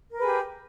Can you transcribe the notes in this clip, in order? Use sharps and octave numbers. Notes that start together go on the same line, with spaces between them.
G4 G#4 A#4 B4